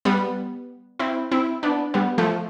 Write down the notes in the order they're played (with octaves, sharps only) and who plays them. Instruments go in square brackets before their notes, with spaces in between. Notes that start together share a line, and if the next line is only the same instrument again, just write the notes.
[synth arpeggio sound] G3 B3
C4 E4
C4 E4
B3 D4
G3 B3
F3 A3